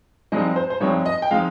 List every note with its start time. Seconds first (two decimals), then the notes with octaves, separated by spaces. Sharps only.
0.32 G2 F3 G#3 C4 D#4 D#5
0.56 C5
0.70 C5
0.81 G2 F3 G#3 C4 D#4 C#5
1.06 D#5
1.22 G5
1.31 F3 G#3 C4 D#4 F5